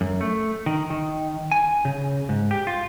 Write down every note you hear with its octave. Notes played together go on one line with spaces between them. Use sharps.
F#2
A3
D#3
D#3
G#5
C#3
G#2
G4
F4